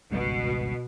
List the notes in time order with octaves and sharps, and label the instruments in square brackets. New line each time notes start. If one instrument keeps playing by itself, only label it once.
[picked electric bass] G#1 C#2 G2 [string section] B2